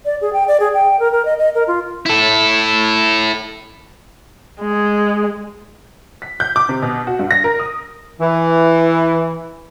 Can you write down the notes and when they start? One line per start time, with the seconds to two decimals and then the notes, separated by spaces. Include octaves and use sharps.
0.05 D5
0.21 G#4
0.33 G5
0.48 D5
0.60 G#4
0.74 G5
0.99 A#4
1.12 A#4
1.25 D#5
1.38 D#5
1.55 A#4
1.68 F4
2.06 E4 A4
4.61 G#3
6.22 B6
6.40 G6
6.56 D6
6.69 C3
6.82 B2
7.07 F#4
7.19 G2
7.31 A#6
7.44 A#4
7.59 D#6
8.21 E3